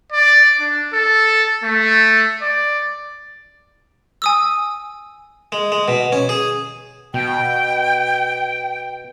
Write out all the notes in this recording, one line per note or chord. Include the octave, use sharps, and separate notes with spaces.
D5
D4
A4
A3
D5
G#5 D#6 E6
G#3
G#3
B2
C#4
G#4
B2 G5